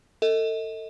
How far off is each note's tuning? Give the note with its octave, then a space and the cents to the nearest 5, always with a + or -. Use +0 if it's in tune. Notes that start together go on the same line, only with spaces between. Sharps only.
A4 +30 D#5 +30